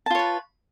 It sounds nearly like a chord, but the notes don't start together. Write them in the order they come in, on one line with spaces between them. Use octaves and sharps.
A5 F4 C#5 B4